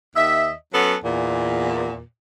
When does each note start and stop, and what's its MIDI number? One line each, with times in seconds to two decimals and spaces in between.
0.16 0.54 39
0.16 0.54 75
0.16 0.54 76
0.74 0.96 54
0.74 0.96 59
0.74 0.96 61
0.74 0.96 69
1.05 2.03 40
1.05 2.03 46